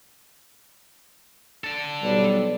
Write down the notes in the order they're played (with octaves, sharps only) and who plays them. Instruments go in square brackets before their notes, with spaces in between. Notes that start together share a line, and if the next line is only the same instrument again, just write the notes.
[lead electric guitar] D4 A4
[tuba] B1 [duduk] G3